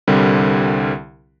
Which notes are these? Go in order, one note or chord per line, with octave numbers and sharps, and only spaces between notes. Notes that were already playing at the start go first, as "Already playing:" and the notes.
C2 D3 G3 C4 A#4